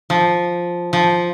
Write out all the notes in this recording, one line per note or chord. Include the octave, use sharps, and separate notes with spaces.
F3
F3